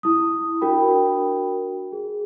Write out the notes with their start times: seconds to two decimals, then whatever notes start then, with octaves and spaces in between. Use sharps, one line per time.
0.03 E4 D#6
0.61 D4 F#4 A#4 G5 B5
1.92 G#4